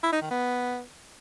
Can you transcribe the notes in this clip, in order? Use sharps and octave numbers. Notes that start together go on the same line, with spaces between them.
E4
D#4
D#3
B3